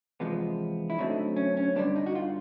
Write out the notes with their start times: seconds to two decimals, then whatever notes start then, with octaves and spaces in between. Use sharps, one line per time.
0.20 E2 C3 F3 G#3 B3
0.90 E4
0.98 F#2 D3 F#3 A3 C4 D#4
1.36 C#4
1.57 C#4
1.75 G2 D3 G3 B3 D4
1.96 D#4
2.06 F#4
2.15 F4